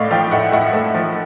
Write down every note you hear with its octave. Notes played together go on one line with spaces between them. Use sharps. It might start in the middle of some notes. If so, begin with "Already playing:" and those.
Already playing: A2 A3 D5 D#5 F5
F3 F5 G5
A2 E5 F#5
A2 E5 F#5
A3
F3